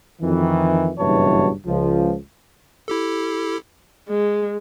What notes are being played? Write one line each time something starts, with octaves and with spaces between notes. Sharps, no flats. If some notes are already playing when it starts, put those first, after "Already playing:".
F2 D#3 E3
F#1 G2 B2 E3 C#5 A5
C#2 F3
E4 G4 A4
G#3